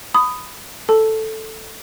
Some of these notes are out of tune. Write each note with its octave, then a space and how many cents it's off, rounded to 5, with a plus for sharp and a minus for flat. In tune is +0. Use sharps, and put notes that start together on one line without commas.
B5 +20 D#6 +0
A4 +0 A5 +0